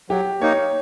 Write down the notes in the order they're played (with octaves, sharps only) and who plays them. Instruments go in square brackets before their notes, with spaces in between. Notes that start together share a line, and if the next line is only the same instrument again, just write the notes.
[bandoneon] F#3 [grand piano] G4
[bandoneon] A#3 D#4 [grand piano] C#5